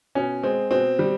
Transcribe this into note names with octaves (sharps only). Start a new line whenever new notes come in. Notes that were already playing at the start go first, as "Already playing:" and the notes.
B2 C#4
G#3 C4
B2 C4
G3